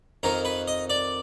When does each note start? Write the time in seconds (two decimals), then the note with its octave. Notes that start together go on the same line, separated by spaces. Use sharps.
0.23 F2 D#3 A#4
0.45 B4
0.68 D#5
0.90 D5